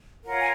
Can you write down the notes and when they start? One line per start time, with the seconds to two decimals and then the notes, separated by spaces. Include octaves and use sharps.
0.24 F4 A#4 C#5 F#5
0.39 G#5